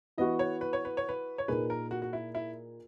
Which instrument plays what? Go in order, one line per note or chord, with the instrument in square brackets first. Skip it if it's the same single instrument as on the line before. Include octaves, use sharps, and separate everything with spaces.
[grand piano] E3 B3 F#4 [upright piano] D#5
[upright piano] C#5
B4
C#5
B4
C#5
B4
C#5
[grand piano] A#2 A#3 D#4 G#4 [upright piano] B4
[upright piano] A#4
F#4
F#4
E4
E4